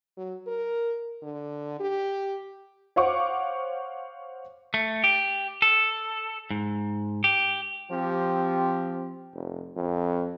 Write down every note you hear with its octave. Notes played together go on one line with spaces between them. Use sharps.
F#3
A#4
D3
G4
C5 C#5 F5 F#5 C#6 D6
A3
G4
A4
G#2
G4
F3 C4 G4
F1
F2